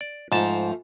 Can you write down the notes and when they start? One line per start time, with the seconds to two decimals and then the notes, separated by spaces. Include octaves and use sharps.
0.01 D5
0.32 G#2 F3 A3 A5